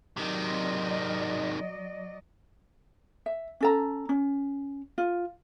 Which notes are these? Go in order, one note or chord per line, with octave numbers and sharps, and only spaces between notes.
C3 D#3 F#3 D5 D#5
E5
C#4 A4 A#5
C#4
F4